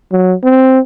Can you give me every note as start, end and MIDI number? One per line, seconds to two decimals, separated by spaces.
0.12 0.33 54
0.44 0.79 60